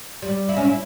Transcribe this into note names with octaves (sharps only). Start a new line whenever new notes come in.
G3
E4
C#4
E4